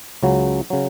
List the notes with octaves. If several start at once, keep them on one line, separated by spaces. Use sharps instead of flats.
C#2 C#3 F#3
C#3 F#3